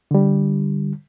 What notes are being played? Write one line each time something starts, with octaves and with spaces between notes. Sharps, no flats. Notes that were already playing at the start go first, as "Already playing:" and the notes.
D3 G3